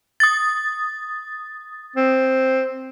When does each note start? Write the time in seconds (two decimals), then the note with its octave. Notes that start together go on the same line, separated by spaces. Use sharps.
0.20 D#6 A6
1.96 C4